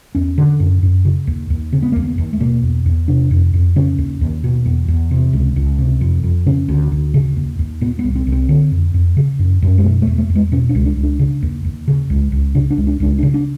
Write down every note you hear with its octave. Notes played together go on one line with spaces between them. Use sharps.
E2 C#4
D3
F#2
F#2
C#3
D#2
D#2
C#3 C4
B3
D#2 A#3
B3
D#2
A3
B2 A#3
E2
E2
C3 D4
F2
F2
C#3 C#4
D#2
D#2
B2
E2
E2
C3
C#2
C#2
C3
F2
F2
C#3 C#4
D2
D2
C#3
D#2
D#2
A#2 B3
B3
C2
C4
C2
C4
D3
F2
F2
C#3
F#2
F#2
G#3
B2 A3
A3
E2
A3
E2
G#3
B2 C#4
D4
C#2
D4
C#2
D4
C#3
D#2
D#2
C#3
C#2
C#2
C#3 D4
D4
C#2
D4
C#2 D4
D4
C#3
D4